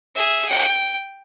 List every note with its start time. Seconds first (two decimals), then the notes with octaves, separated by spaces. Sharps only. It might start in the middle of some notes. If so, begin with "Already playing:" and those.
0.15 G#4 E5
0.48 G5